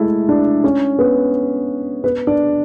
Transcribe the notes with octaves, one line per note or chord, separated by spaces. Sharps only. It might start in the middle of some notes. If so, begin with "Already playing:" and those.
Already playing: G#3 A3 E4 G#4 A4 E5
D4 D5
C#4 C#5
B3 B4
B3 B4
D4 D5